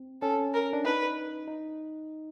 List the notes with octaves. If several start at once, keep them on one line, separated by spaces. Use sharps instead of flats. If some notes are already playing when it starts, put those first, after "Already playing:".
Already playing: C4
C#4 A4
A#4
D4
D#4 B4
D#4